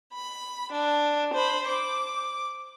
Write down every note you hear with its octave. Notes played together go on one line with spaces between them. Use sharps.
B5
D4
C5 B5
D6